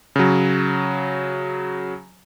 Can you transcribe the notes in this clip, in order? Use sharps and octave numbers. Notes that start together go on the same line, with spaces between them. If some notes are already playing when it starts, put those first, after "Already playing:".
C#3 F#3